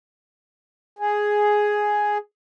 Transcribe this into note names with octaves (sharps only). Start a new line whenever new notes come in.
G#4